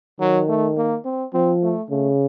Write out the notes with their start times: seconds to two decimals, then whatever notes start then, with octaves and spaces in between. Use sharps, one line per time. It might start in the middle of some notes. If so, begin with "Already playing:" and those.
0.20 D#3 F#3
0.49 A3
0.77 A#3
1.05 C4
1.33 F3 C4
1.62 A3
1.90 C#3 A3